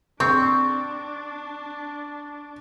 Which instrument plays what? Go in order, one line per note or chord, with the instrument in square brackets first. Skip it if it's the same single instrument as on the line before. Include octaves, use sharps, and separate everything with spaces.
[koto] C4 [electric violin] D4 [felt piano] C#6